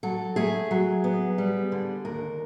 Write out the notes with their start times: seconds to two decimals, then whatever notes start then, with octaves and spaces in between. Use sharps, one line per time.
0.03 F#3 A4
0.36 A3 G#4
0.71 F#3
1.04 B3
1.38 G3
1.72 D3
2.05 D#2 A#4